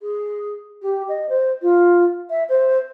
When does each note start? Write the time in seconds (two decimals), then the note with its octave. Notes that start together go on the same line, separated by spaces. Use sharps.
0.02 G#4
0.82 G4
1.08 D#5
1.29 C5
1.62 F4
2.30 E5
2.49 C5